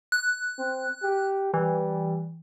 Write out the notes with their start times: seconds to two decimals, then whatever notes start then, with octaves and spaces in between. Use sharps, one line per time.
0.12 F#6
0.59 C4
1.03 G4
1.54 E3 G3